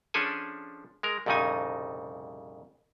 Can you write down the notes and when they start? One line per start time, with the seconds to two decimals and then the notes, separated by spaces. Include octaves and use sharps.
0.14 F3 C#4 D4 G#4 A4 G#5
1.03 G#3 A#4
1.26 C2 F2 A#2 C#3 D#4 G#5